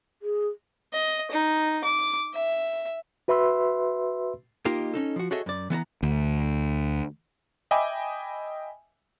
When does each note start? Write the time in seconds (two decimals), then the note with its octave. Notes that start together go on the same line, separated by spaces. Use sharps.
0.22 G#4
0.93 D#5
1.32 D#4
1.84 D6
2.34 E5
3.28 F#4 B4 E5 B5 C6 E6
4.65 A#3 D#4 F4 G4 A#4
4.94 C#4 D#4 A4
5.16 F3 F#4
5.31 F#4 G#4 A4 C#5 D#5 E5
5.46 F#2 D5
5.70 E3 B3 A5 A#5
6.03 D2
7.71 D#5 E5 G5 G#5 B5 D6